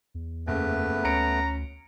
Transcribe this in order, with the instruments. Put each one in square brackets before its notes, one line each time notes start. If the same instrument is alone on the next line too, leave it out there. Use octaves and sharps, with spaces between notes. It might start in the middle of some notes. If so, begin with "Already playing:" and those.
[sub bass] E2
[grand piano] F#1 [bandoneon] A3 B3 B4
[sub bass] D2 [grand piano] C#4 C#7 D7 [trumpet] A#5